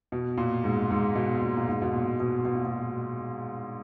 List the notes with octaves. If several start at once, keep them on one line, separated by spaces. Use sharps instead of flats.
B2
A#2
G#2
G#2
B2
A#2
A#2
G#2
B2
A#2
B2
B2
A#2
B2